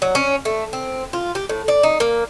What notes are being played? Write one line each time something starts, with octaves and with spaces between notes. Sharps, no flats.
F#3
C#4
A3
C4
F4
G4
A2
D5
D#4
A#3